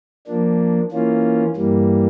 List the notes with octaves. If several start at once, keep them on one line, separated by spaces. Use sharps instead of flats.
F3 A#3 D4
E3 A#3 C#4 F4
G2 E3 G3 A#3